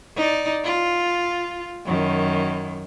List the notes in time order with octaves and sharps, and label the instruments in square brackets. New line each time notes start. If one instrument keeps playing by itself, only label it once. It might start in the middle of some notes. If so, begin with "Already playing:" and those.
[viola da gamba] D#4 D5
F4
F#2 D#3